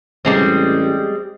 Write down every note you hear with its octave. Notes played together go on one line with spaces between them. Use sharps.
A1 G3 G#3 C4